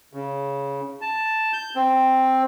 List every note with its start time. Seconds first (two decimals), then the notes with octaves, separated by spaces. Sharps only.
0.13 C#3
1.01 A5
1.53 G6
1.76 C4